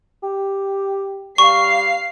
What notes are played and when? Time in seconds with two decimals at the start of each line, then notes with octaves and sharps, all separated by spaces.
0.23 G4
1.38 G3 F5 C#6 C7